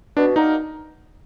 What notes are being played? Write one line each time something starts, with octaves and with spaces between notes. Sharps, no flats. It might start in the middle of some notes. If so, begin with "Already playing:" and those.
B2 D4
A#3 D4 D#4 F#4 A#4